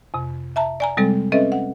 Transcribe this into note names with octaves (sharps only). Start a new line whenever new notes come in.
F2 C3
E5 A5 A#5
D5 G#5 A#5
C3 G3 G#3 C4 A4
C4 C#4 A4 B4 D#5 E5
F#5